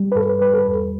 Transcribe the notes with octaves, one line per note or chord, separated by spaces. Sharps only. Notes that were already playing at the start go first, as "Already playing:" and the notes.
Already playing: G3
B4
G2 A4
B4
G3 B4
A4
E2